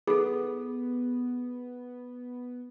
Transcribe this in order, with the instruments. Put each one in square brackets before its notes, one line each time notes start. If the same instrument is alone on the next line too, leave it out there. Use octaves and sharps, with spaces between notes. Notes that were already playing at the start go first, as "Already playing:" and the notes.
[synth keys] B3 [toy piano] G#4 A4